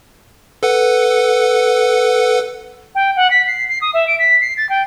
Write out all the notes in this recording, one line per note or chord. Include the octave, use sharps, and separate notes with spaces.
A4 B4 F#5
G5
F#5
B6
C7
C7
D#6
E5
D7
B6
C7
A6
G5